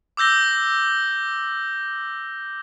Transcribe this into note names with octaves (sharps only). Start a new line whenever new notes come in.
D6 E6 G6 A#6 G7